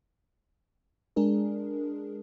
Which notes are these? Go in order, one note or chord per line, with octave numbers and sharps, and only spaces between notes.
G#3 D4 G#4 A#4